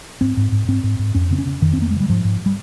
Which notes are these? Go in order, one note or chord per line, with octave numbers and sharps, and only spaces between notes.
G#2 C4
G#2
G#2
G#2 C4
G#2
G#2
F2 C#4
C#3 C4
C#4
C#3
F2 D#3
C4
F2 A#3
C#3 G#3
G3
G#2 F3
G#2
G3